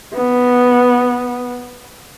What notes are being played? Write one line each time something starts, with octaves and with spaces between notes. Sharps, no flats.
B3